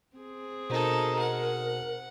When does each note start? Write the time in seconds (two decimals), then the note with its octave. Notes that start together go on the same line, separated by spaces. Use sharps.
0.16 C4 G#4
0.70 B2 D#4 F#4 A4 A#4 C5
1.19 F#5